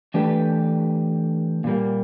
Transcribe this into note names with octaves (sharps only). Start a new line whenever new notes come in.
E3 A3 D4 G4 B4
A#2 G3 A#3